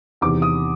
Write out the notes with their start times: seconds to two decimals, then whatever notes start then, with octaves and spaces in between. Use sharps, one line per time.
0.21 E2 C3 D#3 D6
0.42 D#6